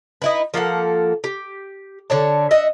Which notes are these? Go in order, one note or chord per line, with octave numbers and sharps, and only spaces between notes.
D#4 E4 B4
F3 A#3 A4 F#5
G4
D3 C#5 A5
D#5 E5 F#5